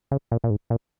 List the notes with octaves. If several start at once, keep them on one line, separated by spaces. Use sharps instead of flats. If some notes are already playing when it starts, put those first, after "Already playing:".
C#3
A#2
A#2
G#2
A#2